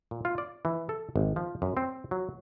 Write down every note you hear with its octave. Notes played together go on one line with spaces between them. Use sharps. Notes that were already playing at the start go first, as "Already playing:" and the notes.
A#2
F4
D5
E3
A4
G#1
F3
F#2
C4
F#3